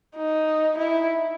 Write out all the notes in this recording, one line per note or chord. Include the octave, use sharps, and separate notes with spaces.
D#4
E4